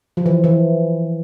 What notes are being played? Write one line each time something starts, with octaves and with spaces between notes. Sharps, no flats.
F3
E3
E3